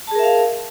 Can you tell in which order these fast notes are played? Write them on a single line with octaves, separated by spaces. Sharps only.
A5 G#4 A#4 E5 F5